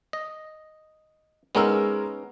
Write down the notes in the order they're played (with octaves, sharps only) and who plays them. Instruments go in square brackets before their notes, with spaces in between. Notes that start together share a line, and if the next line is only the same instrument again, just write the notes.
[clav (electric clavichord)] D#5
[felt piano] G#3 A#4 E6 [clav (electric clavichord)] B3 C#4 D#4